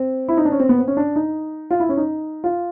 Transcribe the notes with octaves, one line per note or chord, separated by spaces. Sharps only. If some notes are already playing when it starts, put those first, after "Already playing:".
Already playing: C4
E4
D#4
D4
C#4
C4
B3
C4
C#4
D4
D#4
F4
E4
C#4
D#4
F4